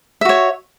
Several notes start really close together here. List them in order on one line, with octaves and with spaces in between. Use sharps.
E5 F#4 C#5